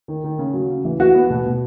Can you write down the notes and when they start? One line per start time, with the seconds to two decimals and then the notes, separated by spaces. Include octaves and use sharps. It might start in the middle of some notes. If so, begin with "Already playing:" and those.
0.08 D#3
0.24 D#3
0.39 C#3
0.54 F#3
0.70 C#3
0.84 E3
1.00 E3 F#4
1.15 B3
1.30 B2
1.46 B2